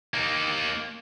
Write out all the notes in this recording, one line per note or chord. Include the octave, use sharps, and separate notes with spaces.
A#3 D#4